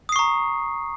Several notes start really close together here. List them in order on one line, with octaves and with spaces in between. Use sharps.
D#6 C7 C#6 A#5